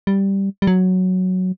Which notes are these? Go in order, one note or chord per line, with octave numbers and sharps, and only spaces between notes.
G3
G3
F#3